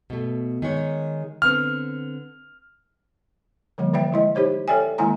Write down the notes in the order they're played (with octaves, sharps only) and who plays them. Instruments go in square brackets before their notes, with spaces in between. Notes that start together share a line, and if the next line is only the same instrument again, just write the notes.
[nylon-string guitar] B2 A3
D#3 G#3 C#5
[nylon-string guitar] D3 B3 C4 [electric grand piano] F6
[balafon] D3 F3 G3 A#3
E3 D5 E5 G5
G#3 E4 D#5
D#4 G4 C5 C#5
A4 C#5 D5 E5 G5 G#5
D#3 G#3 A#3 E4 G#5 A#5